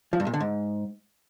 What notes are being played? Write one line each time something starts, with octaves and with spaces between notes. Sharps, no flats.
F3
G2
A#2
D3
G#2